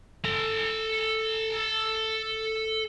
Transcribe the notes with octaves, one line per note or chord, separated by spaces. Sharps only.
A4 A#5